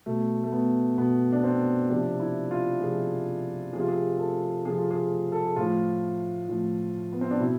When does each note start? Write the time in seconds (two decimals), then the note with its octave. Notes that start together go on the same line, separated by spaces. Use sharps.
0.06 B2 A3
0.44 A3
0.52 B3
0.98 B2 B3
1.32 D4
1.44 C4
1.90 C3 F3 D4
2.20 E4
2.51 F4
2.81 C3 F3 G#4
3.73 F3 G#4
3.77 C3 F4
3.88 G#4
4.19 A4
4.65 C3 F3 G#4
4.78 F4
4.91 G#4
5.32 A4
5.44 G#4
5.56 A2 F3 F4
6.49 A2 F3
7.12 B3
7.21 C4
7.31 D4
7.40 B2 E4